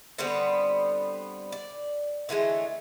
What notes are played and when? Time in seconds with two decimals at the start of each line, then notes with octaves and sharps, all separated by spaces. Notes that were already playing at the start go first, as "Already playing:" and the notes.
0.18 D3 G3 B3 C4
1.52 D5
2.29 D3 E3 G#3 A3